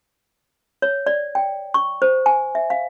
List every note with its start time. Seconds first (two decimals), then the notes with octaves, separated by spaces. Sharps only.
0.82 C#5
1.06 D5
1.35 G5
1.74 C#6
2.02 C5
2.26 G#5
2.55 E5
2.70 F5